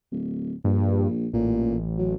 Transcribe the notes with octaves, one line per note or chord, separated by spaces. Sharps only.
D1
A#1 G2
A1 A#2
F#3